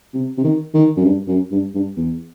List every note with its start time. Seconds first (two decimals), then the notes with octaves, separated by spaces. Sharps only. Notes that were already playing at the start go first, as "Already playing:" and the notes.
0.14 C3
0.38 C3
0.44 D#3
0.74 D#3
0.97 F#2
1.05 G2
1.28 F#2
1.51 G2
1.74 G2
1.96 E2